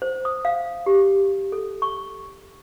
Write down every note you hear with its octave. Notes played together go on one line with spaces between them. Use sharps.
C5
D#6
F5
G4
A4
C#6